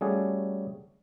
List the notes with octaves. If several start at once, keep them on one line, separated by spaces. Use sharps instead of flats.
G3 A3 C#4 F#4 G#4 A4